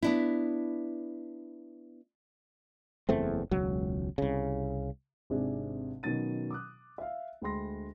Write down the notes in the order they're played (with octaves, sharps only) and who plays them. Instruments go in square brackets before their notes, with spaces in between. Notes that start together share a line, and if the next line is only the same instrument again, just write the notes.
[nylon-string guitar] B3 D4 E4
[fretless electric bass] F#1 E2 A3 C4
E1 C#2 F#3
C2 C#3
[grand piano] G#1 C3 D4 G#4
B2 D#3 F#3 C#4 A6 D#7
D6 D#6 F#6
E5 F5
D2 G#3 G5 B5 C6 A#6